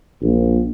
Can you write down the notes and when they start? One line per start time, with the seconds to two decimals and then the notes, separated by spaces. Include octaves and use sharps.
0.22 A#1